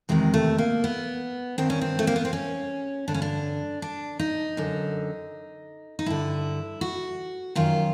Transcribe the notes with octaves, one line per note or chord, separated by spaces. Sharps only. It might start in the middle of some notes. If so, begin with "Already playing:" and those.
E2 C3 D#3 G#3
A3
A#3
B3
G2 D#3 C4
C#4
C4
A3
A#3
B3
C4
C#4
G2 D3 D4
C#4
D4
D4
D#4
F#2 D3
D#4
G2 D3 E4
F#4
F#2 D#3 F4